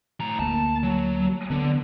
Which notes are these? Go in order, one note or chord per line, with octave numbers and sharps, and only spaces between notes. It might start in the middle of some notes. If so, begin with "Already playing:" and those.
A2 A#5
D2 A#3 A5
F#3
D3 B3